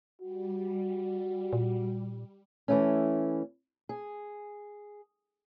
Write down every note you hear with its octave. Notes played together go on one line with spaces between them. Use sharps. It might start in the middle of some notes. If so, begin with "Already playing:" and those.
G3 F#4
A#2
E3 A3 C#4
G#4